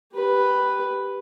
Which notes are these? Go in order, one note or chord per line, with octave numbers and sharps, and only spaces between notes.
G4 B4